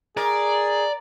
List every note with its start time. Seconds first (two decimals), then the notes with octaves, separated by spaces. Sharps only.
0.17 G#4 A#4 D5